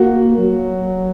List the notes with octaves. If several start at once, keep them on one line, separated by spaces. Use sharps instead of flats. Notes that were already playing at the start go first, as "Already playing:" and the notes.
Already playing: A#3 F#4
F#3